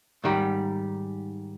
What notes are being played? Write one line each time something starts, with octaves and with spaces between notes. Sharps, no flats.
G#2 D#3 G3